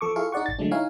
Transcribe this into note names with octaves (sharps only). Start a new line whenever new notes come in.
F3 A4 C#6 D6
E4 F4 G#4 A4 F5 C#6
D#4 G#4 D5 F#5 C#6
G#1 A6
D3 F#3 G#3 A3 D4
D#4 E4 C#5 F5 G#5